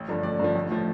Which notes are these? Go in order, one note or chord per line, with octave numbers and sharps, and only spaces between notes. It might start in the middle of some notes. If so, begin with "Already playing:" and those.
Already playing: A1
G2 D3 F3
A1 D5
G2 D3 F3
A1
A2 F3